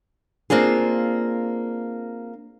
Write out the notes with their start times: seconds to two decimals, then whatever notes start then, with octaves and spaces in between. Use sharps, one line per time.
0.50 A#3 C4 D4 F4 G#4